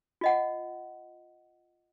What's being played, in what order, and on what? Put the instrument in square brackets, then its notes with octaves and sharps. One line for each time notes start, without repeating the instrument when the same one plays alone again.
[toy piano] F4 D#5 F#5